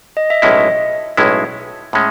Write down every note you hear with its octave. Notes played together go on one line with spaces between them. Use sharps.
D#5
E5
B1 A2 G#3 C#4 E4 D#5
B1 A2 G#3 C#4 E4
A2 G#3 C#4